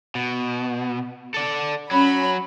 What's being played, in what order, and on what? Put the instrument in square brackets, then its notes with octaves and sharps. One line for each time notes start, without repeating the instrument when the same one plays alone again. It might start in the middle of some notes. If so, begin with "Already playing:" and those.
[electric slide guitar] B2
A4 D5
[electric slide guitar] F#3 [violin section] C#4 B5